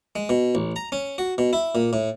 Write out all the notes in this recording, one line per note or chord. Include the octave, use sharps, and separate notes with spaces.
G#3
B2
A1
A#5
C#4
F#4
B2
E4
A#2
A2